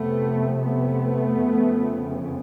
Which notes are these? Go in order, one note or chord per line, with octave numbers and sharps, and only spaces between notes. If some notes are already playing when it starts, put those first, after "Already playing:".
Already playing: F2 C3 A3 B3
A3 B3
F2 C#3